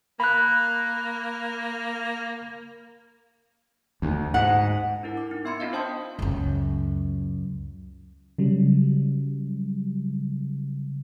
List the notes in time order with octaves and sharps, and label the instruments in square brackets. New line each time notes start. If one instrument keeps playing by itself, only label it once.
[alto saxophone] A#3 [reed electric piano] B5 F#6
[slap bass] D2
[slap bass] G#2 [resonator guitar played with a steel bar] F#5
[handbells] D4 E4 A#4
D6
D#4
B3 E5 B5 C6 G#6 C#7
C4 D4 F4 D#5 F5
C5 G5 A5 C6 D#6 G6
[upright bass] C#2 F#2
[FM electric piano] C#3 F#3 G3